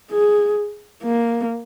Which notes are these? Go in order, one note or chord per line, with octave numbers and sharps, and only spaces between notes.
G#4
A#3